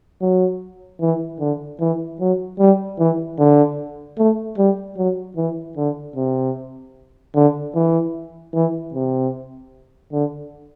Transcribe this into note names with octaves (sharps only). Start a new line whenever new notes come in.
F#3
E3
D3
E3
F#3
G3
E3
D3
A3
G3
F#3
E3
D3
C3
D3
E3
E3
C3
D3